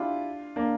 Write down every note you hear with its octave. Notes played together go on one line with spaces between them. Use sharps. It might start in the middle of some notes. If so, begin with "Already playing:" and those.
Already playing: D4 E4 F4 G4
A#3 D4